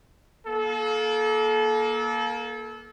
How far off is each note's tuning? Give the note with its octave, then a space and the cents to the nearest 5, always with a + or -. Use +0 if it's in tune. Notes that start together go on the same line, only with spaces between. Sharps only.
A#3 +15 A4 -30